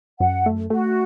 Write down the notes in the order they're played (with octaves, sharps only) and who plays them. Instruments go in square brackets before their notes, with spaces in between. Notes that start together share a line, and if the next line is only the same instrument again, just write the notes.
[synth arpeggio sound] F#2 [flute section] F#5
[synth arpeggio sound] A3
[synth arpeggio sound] A3 [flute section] F#4